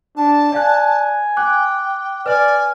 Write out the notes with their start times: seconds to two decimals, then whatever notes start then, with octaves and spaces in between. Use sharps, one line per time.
0.17 D4 A5
0.52 D5 F5 G#5 F#6
1.37 G5 D6 F#6
2.26 B4 D5 G#5 F6